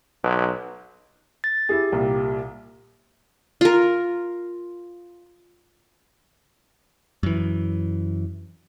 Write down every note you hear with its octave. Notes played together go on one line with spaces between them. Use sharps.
B1
A6
E4 G4 G#4
C2 A#2 G3
F4 A#4
F#2 E3